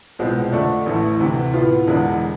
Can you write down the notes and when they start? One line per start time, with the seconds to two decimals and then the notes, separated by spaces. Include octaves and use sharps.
0.19 C2 B2 G#3 C4 F4
0.52 F2 D3 A3 D4 A4
0.86 A1 A2 E3 A3
1.20 D2 C3 E3
1.54 A2 E3 B3 F4
1.87 E1 E2 D3 G#3